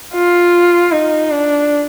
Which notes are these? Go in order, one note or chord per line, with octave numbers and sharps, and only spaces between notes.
F4
D#4
D4